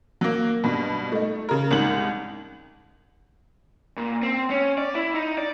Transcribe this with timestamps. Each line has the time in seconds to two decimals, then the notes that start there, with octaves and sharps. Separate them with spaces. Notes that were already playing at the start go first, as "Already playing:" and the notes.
0.21 F#3 A#3
0.64 G2 B2
1.12 A3 D#4
1.49 C#3 A#4
1.71 C2 G#2 F#7
3.97 A#2
4.22 C4
4.50 C#4
4.78 D5
4.95 E4
5.15 D#4
5.38 D5